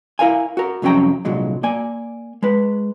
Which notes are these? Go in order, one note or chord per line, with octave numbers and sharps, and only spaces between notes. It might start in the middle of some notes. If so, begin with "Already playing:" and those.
E4 A#4 F5 G#5
F#4 A#4
C2 F2 F#3 C#4 G5 A#5
C2 A#2 D3 F#3 G#3
A#3 D5 G#5
G#3 B4